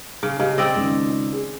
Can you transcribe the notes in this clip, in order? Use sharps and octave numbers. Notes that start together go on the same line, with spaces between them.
C#3
C#3 G4 D#5 F5
C4 D5 D#5 E6
C#2 D#3
G#4